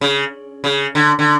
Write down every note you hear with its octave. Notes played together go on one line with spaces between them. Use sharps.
C#3
C#3
D3
D3